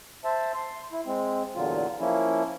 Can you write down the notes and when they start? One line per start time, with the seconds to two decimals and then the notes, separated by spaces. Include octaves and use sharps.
0.25 C5 E5 A5
0.55 C6
0.92 E4
1.06 G#3 C4
1.55 E2 A#2 D3 F#3 F4
2.00 F3 A#3 C#4 E4